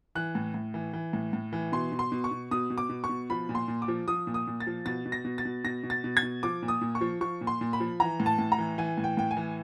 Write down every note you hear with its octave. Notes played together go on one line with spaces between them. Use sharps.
E3 F#6
A2
A2
E3
E3
A2
A2
E3
B2 C6
B2
C6
B2
C#6
B2
B2 D#6
B2
D6
B2
C#6
B2
F3 B5
A#2
C6
A#2
D6
F3
F3 D#6
A#2
D#6
A#2
A6
F3
B2 A6
B2
A#6
B2
A6
B2
B2 A#6
B2
A6
B2
G#6
B2
F3 D6
A#2
D#6
A#2
C#6
F3
F3 C#6
A#2
C6
A#2
B5
F3
E3 A#5
A2
A5
A2
A#5
E3
E3 G#5
A2
G5
A2 G5
G#5
E3